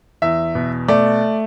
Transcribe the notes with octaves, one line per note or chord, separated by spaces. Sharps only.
E2 E5
B2
A3 D5